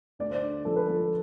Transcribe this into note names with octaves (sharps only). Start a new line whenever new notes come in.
D2 D5
C5
D5
D3
F3 A4
B4
F3 A4
A4